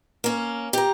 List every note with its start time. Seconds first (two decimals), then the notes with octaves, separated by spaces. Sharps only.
0.24 A#3 C#4
0.73 G4 A#5